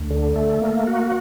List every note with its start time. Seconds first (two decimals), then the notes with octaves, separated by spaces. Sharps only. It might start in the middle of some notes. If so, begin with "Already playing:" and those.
Already playing: D2
0.10 D3
0.36 A3
0.62 A#3
0.87 F#4